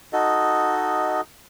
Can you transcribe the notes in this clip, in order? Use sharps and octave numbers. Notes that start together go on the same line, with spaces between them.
D#4 F#4 A4 D#5